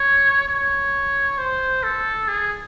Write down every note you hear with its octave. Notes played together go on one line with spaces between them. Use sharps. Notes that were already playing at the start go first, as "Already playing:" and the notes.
Already playing: C#5
C#5
C5
A4
G#4